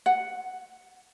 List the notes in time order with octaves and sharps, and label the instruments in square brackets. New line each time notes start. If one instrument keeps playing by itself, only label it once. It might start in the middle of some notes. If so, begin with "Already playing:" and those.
[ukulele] F#5